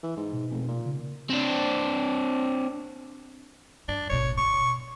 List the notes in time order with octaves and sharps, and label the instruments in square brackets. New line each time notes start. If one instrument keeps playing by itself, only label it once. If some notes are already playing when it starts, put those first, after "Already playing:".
[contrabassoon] E3
G#2
[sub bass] B2
[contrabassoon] F1
A#2
[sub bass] C#3
[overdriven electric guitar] C4 D4
[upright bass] G2 [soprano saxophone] D4
[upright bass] G#1 B2 [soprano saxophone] C#5
[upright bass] B2 [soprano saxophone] C#6